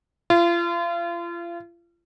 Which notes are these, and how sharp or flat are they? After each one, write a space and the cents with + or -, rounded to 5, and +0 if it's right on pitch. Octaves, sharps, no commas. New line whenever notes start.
F4 -35